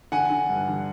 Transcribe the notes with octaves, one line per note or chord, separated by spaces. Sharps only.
D3 F#5 G#5
D3
G2
D3